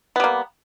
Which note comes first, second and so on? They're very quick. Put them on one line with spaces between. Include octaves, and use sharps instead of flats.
B3 G3 A#3